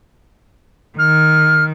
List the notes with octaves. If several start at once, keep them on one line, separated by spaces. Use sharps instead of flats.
D#3 F6